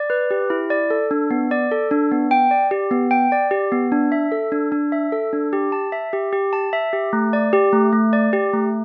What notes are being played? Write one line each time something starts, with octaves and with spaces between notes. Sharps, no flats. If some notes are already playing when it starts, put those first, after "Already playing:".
Already playing: D5
B4
G4
E4
D5
A4
D4
B3
D5
A4
D4
B3
G5
D5
G4
B3
G5
D5
G4
B3
D4
E5
A4
D4
D4
E5
A4
D4
G4
A5
E5
G4
G4
A5
E5
G4
A3
D5
G4
A3
A3
D5
G4
A3